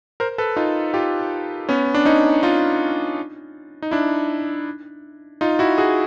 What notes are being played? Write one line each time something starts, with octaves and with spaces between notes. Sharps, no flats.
A#4 C5
A4 B4
D#4 F4
F4 G4
B3 C#4
D4
C#4 D#4
D#4 F4
D#4
D4 E4
D#4 F4
E4 F#4
F#4 G#4